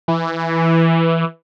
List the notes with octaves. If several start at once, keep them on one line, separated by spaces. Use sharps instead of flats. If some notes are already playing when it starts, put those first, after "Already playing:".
E3